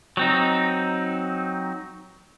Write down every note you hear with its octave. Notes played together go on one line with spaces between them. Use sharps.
F#3 C4 D#4